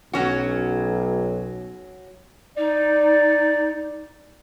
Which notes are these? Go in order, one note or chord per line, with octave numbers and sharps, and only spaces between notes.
B1 F#3 C#4 F#4
D#4 D5